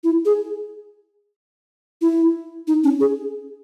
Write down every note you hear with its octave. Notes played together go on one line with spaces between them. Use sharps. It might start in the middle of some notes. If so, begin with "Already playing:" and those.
E4
G#4
E4
D#4
C#4
G#4